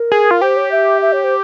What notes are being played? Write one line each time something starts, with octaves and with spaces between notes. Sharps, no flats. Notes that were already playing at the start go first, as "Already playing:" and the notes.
Already playing: A#4
G#4
F4
G4 C5
C#5
E5
E5
C#5
C5